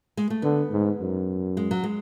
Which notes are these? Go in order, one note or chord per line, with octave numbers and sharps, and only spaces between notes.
G#3
A3
D3 B3
G#2
F#2
G#3
F#3
G#3